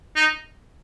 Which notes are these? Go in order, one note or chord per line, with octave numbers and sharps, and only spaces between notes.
D#4